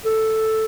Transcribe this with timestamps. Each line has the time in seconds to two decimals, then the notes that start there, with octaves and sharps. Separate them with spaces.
0.05 A4